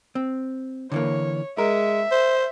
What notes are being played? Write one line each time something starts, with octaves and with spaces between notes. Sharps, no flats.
C4
D3 E3 A#3 C#5
G#3 A#4 E5
C5